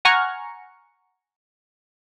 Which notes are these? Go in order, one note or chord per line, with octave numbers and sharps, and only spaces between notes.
F#5 G#5 A#5 C#6 F6